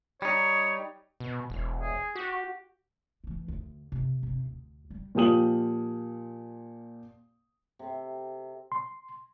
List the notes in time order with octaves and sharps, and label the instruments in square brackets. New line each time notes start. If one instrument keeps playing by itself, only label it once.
[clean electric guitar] G3 D#4 [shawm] C#5
[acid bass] B2
E1
[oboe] G#4
[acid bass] F#4 [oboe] G4
[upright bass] E3 A3
D2
C3
C3 C4
D2
G3
[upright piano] A#2 F3 G4 D#6 F#7
[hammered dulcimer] C3 A4
[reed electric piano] C6